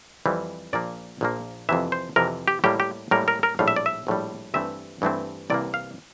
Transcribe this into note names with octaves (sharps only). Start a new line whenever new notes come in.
F2 E3 G3 C4
A#1 A#2 F3 A#3 D5
A#1 A#2 F3 A#3
F2 C3 E3 E5
C5
F2 C3 E3 A#4
G4
A2 G3 A#3 G4
G4
A2 G3 A#3 A#4
A#4
A#4
A#1 A2 G3 F5
E5
D5
E5
A#1 A2 G3
G2 E3 A3 C4 E5
G2 E3 A3 C4
C2 C3 E3 A#3 D5
F5